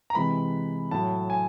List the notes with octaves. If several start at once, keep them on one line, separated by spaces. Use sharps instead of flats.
A#5
C3 E3 G#3 B5
A2 F#3 A5
G#5